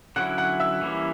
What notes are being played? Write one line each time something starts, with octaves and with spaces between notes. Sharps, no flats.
D3 F#3 C#4 E4 F#5 F#6
F#5 F#6
E5 E6
E3 G3 A#3 C#4 E4